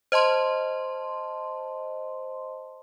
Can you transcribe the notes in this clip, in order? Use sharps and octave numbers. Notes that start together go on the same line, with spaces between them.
C5 D#5 A5 C6